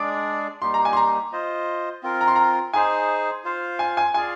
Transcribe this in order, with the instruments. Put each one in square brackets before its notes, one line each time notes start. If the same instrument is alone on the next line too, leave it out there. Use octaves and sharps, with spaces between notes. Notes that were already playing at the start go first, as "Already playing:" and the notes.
Already playing: [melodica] G#3 D4 G#4 D5 [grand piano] D6
[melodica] G3 A#3 D#4 G4 [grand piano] C6
[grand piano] A#5
G#5
C6
A#5
[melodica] F4 C5 D#5
C4 F4 A#4
[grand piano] A#5
C6
A#5
[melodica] D#4 G#4 C5 [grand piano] G#5
[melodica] F4 C5 F5
[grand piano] G#5
G#5
[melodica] F4 G#4 D5 F5 [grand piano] G#5